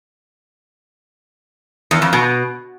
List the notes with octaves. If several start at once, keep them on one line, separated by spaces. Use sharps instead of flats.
E2
F2
B2